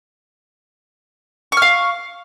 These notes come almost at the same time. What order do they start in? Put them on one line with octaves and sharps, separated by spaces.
C#6 F6 F5